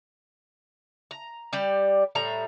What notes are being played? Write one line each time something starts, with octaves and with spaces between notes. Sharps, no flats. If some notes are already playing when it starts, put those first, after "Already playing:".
A#5
G3 G4 D5
A2 G3 A#5